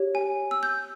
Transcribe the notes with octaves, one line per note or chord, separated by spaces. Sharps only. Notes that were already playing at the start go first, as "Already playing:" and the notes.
Already playing: G4 C#5
G#5
E6
G6